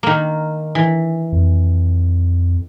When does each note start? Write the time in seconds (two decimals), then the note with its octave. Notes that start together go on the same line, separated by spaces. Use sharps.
0.03 D#3 A#3
0.75 E3
1.32 F2